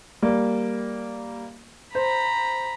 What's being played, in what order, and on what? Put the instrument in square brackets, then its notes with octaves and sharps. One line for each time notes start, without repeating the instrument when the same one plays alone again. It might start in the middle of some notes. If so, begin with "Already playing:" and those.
[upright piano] G3 A#3
[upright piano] C5 [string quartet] A#5 B5